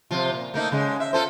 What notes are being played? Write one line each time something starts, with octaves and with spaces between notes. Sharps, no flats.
C3 F3 F4
A#2
A3 A#3 D#4
C#3 G#3
E5
F4 A4 C5